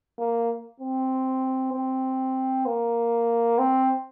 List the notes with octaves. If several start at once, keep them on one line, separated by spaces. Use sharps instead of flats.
A#3
C4
C4
A#3
C4